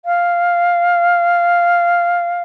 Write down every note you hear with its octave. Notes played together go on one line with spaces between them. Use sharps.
F5